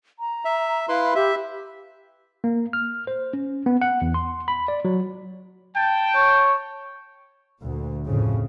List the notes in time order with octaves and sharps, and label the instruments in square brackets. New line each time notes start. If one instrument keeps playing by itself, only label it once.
[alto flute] A#5
[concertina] E5
[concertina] E4 B4 C6 [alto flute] F5
[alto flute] G4 [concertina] E5
[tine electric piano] A#3
F6
C5
C#4
B3
F#5
E2
C6
B5
D5
F#3
[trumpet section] G5 A5
[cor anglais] C#5
[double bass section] D2 A#2
F2 A2 C#3